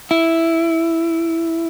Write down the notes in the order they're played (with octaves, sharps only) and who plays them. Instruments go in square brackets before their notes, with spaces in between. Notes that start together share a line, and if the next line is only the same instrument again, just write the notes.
[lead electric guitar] E4